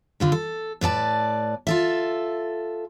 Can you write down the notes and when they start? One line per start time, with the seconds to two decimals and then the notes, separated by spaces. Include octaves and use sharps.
0.20 D3 F4 B4
0.32 A4
0.81 A2 B4 D5 A5
1.67 F4 A4 E5